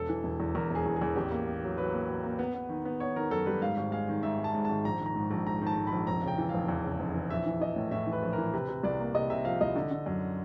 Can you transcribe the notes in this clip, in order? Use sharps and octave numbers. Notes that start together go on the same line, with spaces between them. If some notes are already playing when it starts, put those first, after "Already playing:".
Already playing: E1 A4
E3
E1
E2
E2 A#4
E1 G#4
E2
G#4
E2
A1 G4
A#3
A#3
F#3
F#3 B4
A#3
F#3
A#3
B3
B3
D#3
B3
B3 C#5
D#3 A#4
F#2 A4
G3 B4
G#2 F5
G#1
G#3 F5
D#3
G#2 E5
G#3
A5
G#2
G#1 A5
A#1 A#5
D#3
A#5
G#2
A#1
G#2 A#5
D#3
A5
G#2
B5
A#1
F1 A#5
C#3 G5
E3
F1 F5
E2
C#3
F1
E3
A#1 E5
E3
E3 D#5
A2
A2 E5
E3
B4
A#1
A#4
E3
C3 B4
C3
C2 D5
A#3
C3 D#5
C3 E5
F3 F5
C2 D#5
D3
D3
F#2